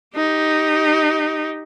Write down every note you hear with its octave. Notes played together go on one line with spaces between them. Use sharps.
D#4 G4